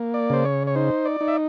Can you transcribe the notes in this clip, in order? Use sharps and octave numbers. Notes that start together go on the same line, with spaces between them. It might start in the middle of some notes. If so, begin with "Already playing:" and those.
Already playing: A#3
D5
C#3 C5
C#5
C#5
D#4 C5
D5
D#4
E5